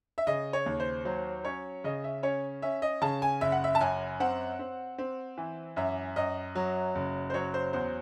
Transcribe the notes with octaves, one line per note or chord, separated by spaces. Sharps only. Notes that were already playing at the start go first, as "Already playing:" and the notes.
E5
C#3 D#5
C#5
D#2
C5
F#3 C5
C#4 C#5
C#3 D#5
E5
C#4 C#5
C#4 E5
D#5
C#3 A5
G#5
F#1 E5
F#5
E5
A5
F#2 G#5
C4 F#5
C4
C4
E3
F#2 E5
F#2 D#5
F#3
F#1
C5
F#3 C#5
C5
E2 C5